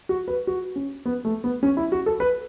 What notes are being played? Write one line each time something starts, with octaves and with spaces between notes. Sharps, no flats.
F#4
B4
F#4
C#4
B3
A3
B3
C#4
E4
F#4
A4
B4